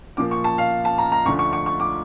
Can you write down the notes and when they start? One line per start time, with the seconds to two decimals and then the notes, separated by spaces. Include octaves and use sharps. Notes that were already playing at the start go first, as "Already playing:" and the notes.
0.17 A#2 F3 A#3 D6
0.31 C#6
0.44 A5
0.58 F5
0.85 A5
0.98 A#5
1.12 A#5
1.25 D2 D3 F3 A3 C#6
1.39 C#6
1.53 C#6
1.66 C#6
1.80 D6